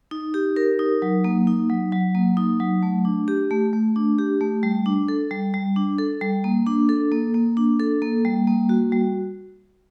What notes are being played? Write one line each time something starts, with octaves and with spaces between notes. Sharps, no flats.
D#4
G4
A#4
D#4
F#3
A#3
D#4
F#3
F#3
A#3
D#4
F#3
A3
D4
G4
A3
A3
D4
G4
A3
G3
D4
A4
G3
G3
D4
A4
G3
A#3
D4
A4
A#3
A#3
D4
A4
A#3
G3
A#3
F#4
G3